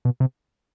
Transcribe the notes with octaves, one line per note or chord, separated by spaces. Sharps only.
B2
C3